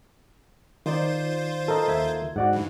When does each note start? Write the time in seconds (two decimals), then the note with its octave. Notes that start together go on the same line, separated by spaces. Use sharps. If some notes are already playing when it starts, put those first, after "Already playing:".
0.86 D#3 D#4 F4 C5 D5
1.68 A4 A#4 D#5
1.88 D#2 E5 G#6
2.36 G#2 F#4 D5 F#5
2.53 G2 E3